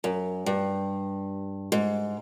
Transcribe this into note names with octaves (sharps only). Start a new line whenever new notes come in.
F#2
G2
G#2